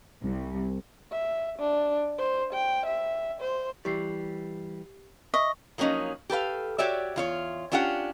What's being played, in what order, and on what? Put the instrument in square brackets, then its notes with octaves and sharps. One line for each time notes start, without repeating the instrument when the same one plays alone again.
[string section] C2
[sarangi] E5
D4
C5
G5
E5
C5
[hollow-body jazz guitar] E3 G3 [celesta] G4 C7
[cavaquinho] D#5 [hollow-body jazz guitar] E5 [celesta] C#6
[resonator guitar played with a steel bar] F3 F#3 A#3 C#4 D#4
G4 A4 B4 F5
F#4 G4 C#5 D5 E5
E2 F4 C#5
C#4 D4 F4 G4 F5 F#5